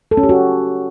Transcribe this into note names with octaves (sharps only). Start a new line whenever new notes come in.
A4
C#4
G4
F#4